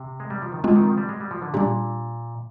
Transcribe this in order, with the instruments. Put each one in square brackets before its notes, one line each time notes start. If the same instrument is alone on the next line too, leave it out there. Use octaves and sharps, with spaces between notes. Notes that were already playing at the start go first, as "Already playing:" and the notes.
Already playing: [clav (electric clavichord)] C3
G#3
G3
F3
D#3
[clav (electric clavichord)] D3 [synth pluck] G#3 C4 F4
[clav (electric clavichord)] D#3
F3
G3
G#3
G3
F3
D3
[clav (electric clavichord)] A#2 [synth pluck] G3 D4 G4